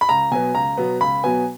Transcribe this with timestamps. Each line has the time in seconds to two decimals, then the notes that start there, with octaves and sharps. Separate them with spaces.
0.01 B5
0.09 C#2 A#5
0.31 B2 F#3 B3 G#5
0.55 C#2 A#5
0.78 B2 F#3 B3
1.01 C#2 B5
1.24 B2 F#3 B3 G#5